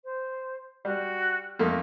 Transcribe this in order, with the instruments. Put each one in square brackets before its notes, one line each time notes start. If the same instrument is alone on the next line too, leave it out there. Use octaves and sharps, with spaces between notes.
[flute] C5
[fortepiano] G3 [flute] F#4
[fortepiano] F2 A3 A#3 [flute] D#4